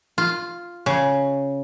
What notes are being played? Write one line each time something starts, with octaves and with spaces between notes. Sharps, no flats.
F4
C#3